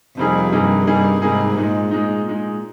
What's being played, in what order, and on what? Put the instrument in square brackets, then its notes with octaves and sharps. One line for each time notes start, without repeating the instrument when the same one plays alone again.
[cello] F2 [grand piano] C3 G3 A#3 D#4 G#4
[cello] G2 [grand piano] C3 G3 A#3 D#4 G#4
[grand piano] C3 G3 A#3 D#4 G#4
[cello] G#2 [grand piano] C3 G3 A#3 D#4 G#4
[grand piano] A#2 G#3 D#4
A#2 G#3 D#4
A#2 G#3 D#4